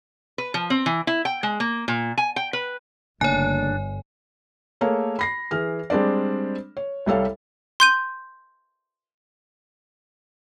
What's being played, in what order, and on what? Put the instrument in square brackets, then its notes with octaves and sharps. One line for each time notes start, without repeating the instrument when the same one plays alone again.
[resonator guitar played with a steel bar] B4
F3
C4
E3
E4
G5
G#3
A#3
A#2
G#5
G5
B4
[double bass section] G1 [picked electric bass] C#3 A3 A#3 [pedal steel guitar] D4 [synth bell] C#5 G#5
[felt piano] A3 A#3 G#4 A#4 C#5
B5 A#6 C7
E3 G#4 F6
G3 G#3 C4 D4 D5
C#5
C2 G3 A4 C#5 F5
[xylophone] C6 G6 D#7